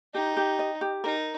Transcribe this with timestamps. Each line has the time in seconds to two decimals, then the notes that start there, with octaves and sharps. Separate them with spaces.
0.14 D#4 G4
0.37 G4
0.59 D#5
0.81 G4
1.04 D#4 A#4